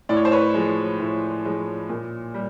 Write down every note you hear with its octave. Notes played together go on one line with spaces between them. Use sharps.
A2 D5
C#5
C5
B4 C#5
F3 G#3
A2
F3 G#3
A#2
G3